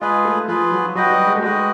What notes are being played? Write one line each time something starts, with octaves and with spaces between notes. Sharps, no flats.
G#3 F4 G#4 B4
A3
F3 F4 G#4 B4
F#3
F#3 F#4 B4 D#5 G5
F#3
G3
G#3
A3
G#3 F#4 B4 D#5 G5